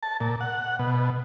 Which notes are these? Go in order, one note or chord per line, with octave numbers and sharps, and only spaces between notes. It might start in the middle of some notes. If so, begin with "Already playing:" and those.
A5
A#2
F#5
B2